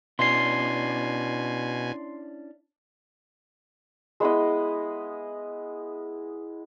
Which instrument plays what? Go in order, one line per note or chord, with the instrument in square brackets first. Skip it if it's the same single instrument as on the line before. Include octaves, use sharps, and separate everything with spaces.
[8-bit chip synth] B2 G#5 [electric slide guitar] C#4 D4 E4 [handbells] C6 C7
[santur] G#3 B3 E4 D#5